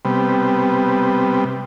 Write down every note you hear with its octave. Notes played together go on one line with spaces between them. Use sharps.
C3 G3 B3